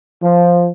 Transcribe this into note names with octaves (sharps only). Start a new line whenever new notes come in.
F3